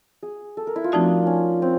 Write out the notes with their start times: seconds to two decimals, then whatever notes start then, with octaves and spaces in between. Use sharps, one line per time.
0.23 G#4
0.57 A4
0.67 A#4
0.76 E4
0.84 F4
0.92 F3 A3 C4 D4 D#4 F#4
1.27 C#4
1.62 C4